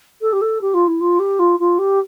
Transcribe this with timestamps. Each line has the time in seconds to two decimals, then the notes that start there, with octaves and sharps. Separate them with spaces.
0.22 A4
0.32 G4
0.41 A4
0.61 G4
0.74 F4
0.87 E4
1.00 F4
1.19 G4
1.39 F4
1.59 F4
1.78 G4